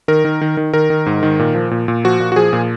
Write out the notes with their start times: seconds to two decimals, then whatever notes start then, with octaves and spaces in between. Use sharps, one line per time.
0.08 D#3 A#4
0.25 D#3
0.41 D#3
0.57 D#3
0.73 D#3 A#4
0.90 D#3
1.06 G#2
1.23 D#3
1.39 A#2
1.55 F3
1.71 A#2
1.88 A#2
2.04 F3 F#4
2.20 A#2
2.32 F#4
2.36 F3 G#4
2.53 A#2